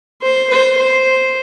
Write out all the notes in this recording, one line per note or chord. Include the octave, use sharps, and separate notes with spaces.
C5
C5
C5